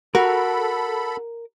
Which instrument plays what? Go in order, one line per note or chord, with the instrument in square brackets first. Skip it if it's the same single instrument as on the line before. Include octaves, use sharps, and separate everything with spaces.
[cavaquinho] F#4 [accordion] A4 B5 [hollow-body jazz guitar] A#4